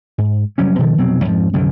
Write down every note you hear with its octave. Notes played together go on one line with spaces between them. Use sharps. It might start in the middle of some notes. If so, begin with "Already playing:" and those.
G#2
F1 F#3 G3 C#4
B2 D#3 F3
F1 B2 F#3 C4
F2 G#2 F3
C2 F#2 D3 D#3